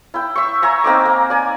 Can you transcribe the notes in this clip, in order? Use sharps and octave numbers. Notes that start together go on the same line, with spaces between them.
E4 G5
E5 C#6
E5 G#5 A#5 C#6
A#3 C4 D#4 D6
A#3
D5 G#5